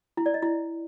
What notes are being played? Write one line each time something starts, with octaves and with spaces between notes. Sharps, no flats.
E4
D5
D#5
E4